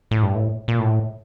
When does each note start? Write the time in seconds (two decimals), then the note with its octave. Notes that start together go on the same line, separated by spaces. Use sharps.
0.11 A2
0.23 G2
0.35 A2
0.68 A#2
0.79 A2